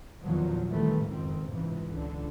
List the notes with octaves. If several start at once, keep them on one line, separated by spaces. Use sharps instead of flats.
E2 A#2 D#3 F3 F#3
D#3 E3 G3 A3 C4
F#1 F2 G#2 D#3 C4
C#2 G#2 C3 E3
C#2 D3